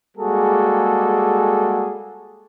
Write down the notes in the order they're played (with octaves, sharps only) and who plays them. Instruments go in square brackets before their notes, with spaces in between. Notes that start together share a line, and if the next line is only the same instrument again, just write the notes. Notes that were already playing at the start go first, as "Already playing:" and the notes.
[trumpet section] G3 G#3 A#3 F#4 G#4 A4